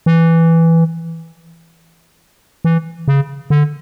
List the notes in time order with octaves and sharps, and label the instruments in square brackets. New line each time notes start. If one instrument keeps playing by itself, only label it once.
[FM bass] E3
E3
C#3
D3